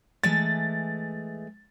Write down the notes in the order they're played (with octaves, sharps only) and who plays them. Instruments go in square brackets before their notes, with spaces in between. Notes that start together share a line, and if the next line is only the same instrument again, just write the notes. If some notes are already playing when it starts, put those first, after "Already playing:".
[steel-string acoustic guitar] E3 G#3 A3 [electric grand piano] A6